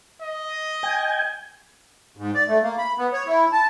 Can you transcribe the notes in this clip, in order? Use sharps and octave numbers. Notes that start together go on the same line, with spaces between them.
D#5
G5 G#5
G#2
D5
A3
A#3
B5
B3
C#5
E4
A5